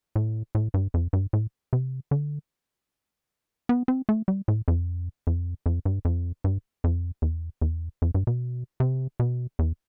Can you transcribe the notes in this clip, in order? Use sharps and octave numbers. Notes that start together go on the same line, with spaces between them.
A2
A2
G2
F2
G2
A2
C3
D3
B3
C4
A3
G3
A2
F2
F2
F2
G2
F2
G2
F2
E2
E2
F2
G2
B2
C3
B2
E2